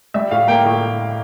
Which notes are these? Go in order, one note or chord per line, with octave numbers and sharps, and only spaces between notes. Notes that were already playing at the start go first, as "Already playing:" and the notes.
G3 E5
A2 F5
A#3 G5
A2